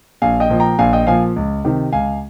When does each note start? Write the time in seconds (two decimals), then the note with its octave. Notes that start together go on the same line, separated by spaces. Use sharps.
0.22 A#1 F5 G#5
0.40 D#5 G5
0.50 A#2 F3
0.60 G5 A#5
0.79 A#1 F5 G#5
0.93 D#5 G5
1.07 A#2 F3 F5 G#5
1.36 C#2
1.65 C3 D#3
1.92 C#2 F5 G#5